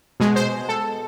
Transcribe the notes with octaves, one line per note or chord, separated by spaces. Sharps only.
B2 G#3
C5
A4